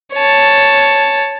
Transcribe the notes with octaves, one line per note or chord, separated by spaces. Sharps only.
C#5 A5